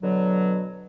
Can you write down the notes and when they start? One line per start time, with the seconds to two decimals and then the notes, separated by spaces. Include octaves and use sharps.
0.03 B2 D3 F#3